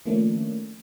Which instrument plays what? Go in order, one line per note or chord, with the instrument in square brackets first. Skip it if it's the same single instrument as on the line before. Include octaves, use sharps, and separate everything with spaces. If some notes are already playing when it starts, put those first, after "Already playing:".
[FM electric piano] D#3 F3 A3 A#3 C#4 D4